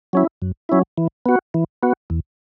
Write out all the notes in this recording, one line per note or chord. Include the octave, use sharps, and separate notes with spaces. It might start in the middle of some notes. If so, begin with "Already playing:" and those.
F#3 C#4 E4
F#2
F#3 C#4 E4
E3
B3 F#4
E3
B3 F#4
E2